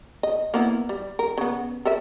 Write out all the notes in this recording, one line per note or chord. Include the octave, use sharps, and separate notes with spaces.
D#5
A#3 B3 E4
G3
A#4
C#3 B3
A4 A#4 E5